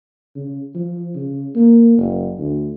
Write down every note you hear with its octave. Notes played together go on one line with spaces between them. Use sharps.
C#3
F3
C#3
A#3
F#1
D2